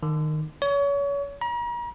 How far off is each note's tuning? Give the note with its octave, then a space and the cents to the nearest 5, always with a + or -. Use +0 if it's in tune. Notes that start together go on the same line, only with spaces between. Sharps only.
D#3 -20
C#5 +30
A#5 +40